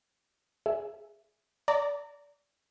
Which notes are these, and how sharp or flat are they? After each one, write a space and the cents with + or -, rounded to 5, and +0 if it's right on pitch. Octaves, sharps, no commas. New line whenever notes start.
G#4 +0 E5 +0
D5 -25 A#5 -30